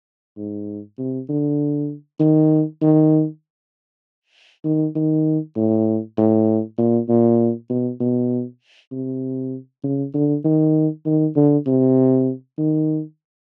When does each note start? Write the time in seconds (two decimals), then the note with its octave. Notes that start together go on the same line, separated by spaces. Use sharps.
0.37 G#2
0.98 C3
1.29 D3
2.20 D#3
2.82 D#3
4.65 D#3
4.96 D#3
5.57 A2
6.18 A2
6.78 A#2
7.09 A#2
7.69 B2
8.01 B2
8.92 C3
9.84 C#3
10.14 D3
10.45 D#3
11.06 D#3
11.36 D3
11.67 C3
12.58 D#3